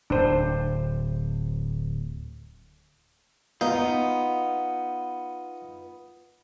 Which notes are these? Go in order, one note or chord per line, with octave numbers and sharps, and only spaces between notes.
D1 D4 C5
B3 D#4 F4 F5